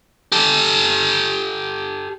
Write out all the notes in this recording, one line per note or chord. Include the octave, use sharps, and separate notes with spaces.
G4 A4